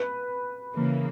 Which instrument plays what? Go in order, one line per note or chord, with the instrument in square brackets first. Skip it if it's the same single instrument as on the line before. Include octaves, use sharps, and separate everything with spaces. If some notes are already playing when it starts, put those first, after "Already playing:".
Already playing: [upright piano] B4
[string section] C#3 E3 A#3